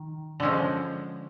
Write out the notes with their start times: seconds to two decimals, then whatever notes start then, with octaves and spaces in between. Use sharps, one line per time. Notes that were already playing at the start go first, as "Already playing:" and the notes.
Already playing: D#3
0.40 D3 F3 G#3 C#4